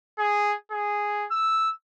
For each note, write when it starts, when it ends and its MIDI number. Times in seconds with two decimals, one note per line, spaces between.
0.19 0.55 68
0.71 1.26 68
1.31 1.70 88